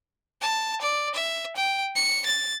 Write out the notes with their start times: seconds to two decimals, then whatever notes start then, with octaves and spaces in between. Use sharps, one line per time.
0.41 A5
0.81 D5
1.15 E5
1.56 G5
1.95 C#7
2.26 A6